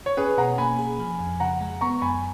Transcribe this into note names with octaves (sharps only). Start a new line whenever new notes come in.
C#5
C#4 G#4 B4
B2 F#5 A#5
A#3 G#5 B5
G#4
F3
F2
C#3 F#5 A#5
G#3
B3 A#5 C#6
F#2 G#5 B5